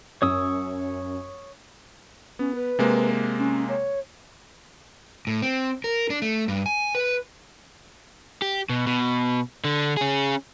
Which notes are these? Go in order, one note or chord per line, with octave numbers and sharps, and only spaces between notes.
F#2 C#5 D#6 E6
B3 C#4
B4
C3 G#3 A#3
C#4
C#5
A2
C4
A#4
D4
A3
G2
G#5
B4
G4
B2
B2
D3
C#4 G#4